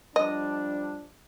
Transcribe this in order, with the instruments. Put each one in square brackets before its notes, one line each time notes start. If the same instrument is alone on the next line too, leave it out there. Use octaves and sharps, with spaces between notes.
[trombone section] F3 G3 D4 [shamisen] D#5